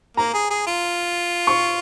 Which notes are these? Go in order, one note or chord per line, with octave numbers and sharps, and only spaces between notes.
A#3 A#5
G#4
G#4
F4
C#6